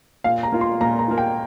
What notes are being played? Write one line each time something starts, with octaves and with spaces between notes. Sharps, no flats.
A#2 F5
A#5
A#3 F4
C6
A#2 A#5
A#5
A#3 F4
G5